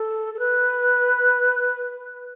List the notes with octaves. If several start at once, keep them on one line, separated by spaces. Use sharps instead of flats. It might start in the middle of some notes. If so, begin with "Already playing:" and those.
Already playing: A4
A4
B4